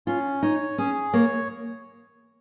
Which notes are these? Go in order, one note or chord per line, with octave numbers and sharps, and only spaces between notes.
C#4 F4
D#4 C#5
C#4 G#4
A#3 C#5